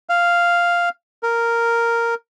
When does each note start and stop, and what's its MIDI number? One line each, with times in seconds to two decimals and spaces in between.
0.09 0.89 77
1.23 2.14 70